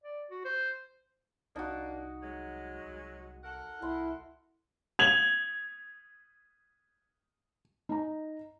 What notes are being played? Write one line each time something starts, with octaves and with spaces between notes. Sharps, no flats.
D5
F#4
C5
C2 F3 A#3 D4 D#4 F#4
F#3 G#3
C2
A4 A#4 F#5
C2 E4 C6
G#6 F7 F#7
D#4 A#5